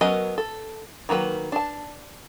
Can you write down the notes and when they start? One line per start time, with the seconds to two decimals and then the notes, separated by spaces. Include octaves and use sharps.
0.01 F#3 B3 C#4 A#4 D#5
0.38 A4
1.09 D#3 F#3 A#3 B4
1.52 D4 A5